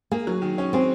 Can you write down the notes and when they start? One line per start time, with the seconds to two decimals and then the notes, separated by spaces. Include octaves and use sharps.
0.11 A#3 G#4
0.27 F#3
0.42 D#3
0.58 C#4
0.73 C4 G#4